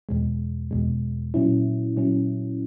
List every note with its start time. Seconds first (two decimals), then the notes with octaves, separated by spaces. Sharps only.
0.09 E2 B2 G#3
0.71 E2 B2 G#3
1.34 A#2 F#3 C#4 E4
1.97 A#2 F#3 C#4 E4